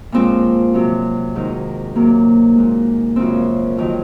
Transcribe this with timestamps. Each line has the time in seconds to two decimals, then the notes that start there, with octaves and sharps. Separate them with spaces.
0.12 A#2 F3 G#3 C4
0.74 C3 F#3
1.35 G#2 D#3 G#3
1.95 C3 F#3 A#3
2.56 A#2 G#3
3.16 F#2 C#3 F3 G#3 C4
3.77 F2 D#3 F#3